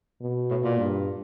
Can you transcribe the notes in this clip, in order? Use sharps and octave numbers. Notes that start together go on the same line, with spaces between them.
B2
A2
A#2
G2